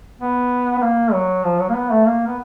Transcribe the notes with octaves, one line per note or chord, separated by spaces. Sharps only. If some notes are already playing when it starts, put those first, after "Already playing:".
B3
B3
A#3
F#3
F3
F#3
A#3
B3
A3
A#3
B3